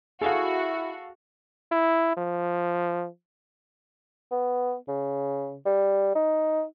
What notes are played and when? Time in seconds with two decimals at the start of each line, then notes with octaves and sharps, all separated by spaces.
0.22 E4 F#4 G#4 A4 F5
1.72 E4
2.17 F3
4.31 B3
4.88 C#3
5.65 G3
6.15 D#4